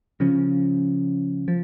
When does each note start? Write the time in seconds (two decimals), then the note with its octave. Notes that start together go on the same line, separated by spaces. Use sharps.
0.20 C#3 F3 C#4
1.48 F3